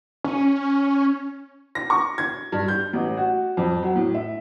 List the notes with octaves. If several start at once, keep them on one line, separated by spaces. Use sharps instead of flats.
C#4
A#6
C#6
G#6
G2
G6
A1
F#4
F2
F#3
A2
E5